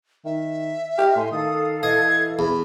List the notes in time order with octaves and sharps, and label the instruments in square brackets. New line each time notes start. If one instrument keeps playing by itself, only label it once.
[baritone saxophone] D#3 [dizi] E5
[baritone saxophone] G4 [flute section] D#5 F6
[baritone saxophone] A2 [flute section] G#5 C6
[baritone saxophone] D#3 [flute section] A4 F5 [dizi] D#6
[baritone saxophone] E3 [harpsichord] D#5 [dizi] G#6
[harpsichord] E2 [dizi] B5